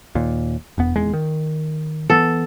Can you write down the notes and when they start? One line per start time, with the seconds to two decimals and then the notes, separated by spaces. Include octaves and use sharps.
0.15 D#2 A#2
0.78 E1 E2 B3
0.95 D#1 E2 G#3
1.13 D#3
2.10 E3 B3 A4